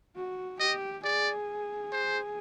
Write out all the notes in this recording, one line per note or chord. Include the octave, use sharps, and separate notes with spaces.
F#4
G4 D#5
G#4 D5
C5